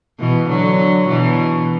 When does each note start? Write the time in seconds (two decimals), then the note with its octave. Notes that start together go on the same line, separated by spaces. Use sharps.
0.19 B2 E3
0.49 D3 F#3
1.08 B2 E3